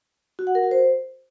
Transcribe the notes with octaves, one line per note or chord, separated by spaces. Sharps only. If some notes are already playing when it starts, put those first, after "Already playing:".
F#4
F#5
A#4
F#4
C5